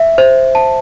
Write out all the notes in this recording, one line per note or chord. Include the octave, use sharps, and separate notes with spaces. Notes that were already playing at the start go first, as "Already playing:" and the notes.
Already playing: E5
C5
A5